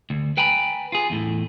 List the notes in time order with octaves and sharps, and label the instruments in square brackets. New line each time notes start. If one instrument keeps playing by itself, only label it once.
[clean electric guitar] D2
B4 G5 G#5 A#5 B5
F4 G#4
E2 A2